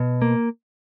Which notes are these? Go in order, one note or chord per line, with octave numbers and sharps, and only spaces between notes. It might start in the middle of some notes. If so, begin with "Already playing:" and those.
Already playing: B2
A#3